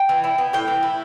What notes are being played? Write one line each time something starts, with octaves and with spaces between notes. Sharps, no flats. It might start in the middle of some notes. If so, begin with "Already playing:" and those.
Already playing: G5
E3
E4
B3
A2 G5
E3
E4